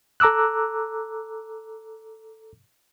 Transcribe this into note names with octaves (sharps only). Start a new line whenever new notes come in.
A4 A#5 D6 E6 F#6